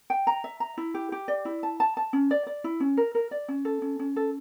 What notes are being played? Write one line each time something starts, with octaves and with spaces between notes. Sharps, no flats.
G5
A#5
E5
A#5
E4
G4
G4
D5
E4
A5
A5
A5
C#4
D5
D5
E4
C#4
A#4
A#4
D5
C#4
A4
C#4
C#4
A4